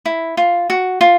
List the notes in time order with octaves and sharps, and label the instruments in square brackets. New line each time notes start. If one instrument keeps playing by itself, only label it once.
[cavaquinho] E4
F4
F#4
F4